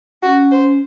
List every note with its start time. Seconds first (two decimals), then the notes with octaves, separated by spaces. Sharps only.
0.23 C#4 F#4
0.51 C5